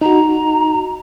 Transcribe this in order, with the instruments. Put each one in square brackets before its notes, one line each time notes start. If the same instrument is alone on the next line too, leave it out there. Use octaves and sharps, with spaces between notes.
[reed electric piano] D#4 F#4 [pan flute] A#5